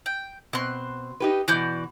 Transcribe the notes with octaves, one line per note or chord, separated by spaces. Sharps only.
G5
B2 C4 C6 F#6
D#4 G4 B4
B2 E3 F#4 D5 G6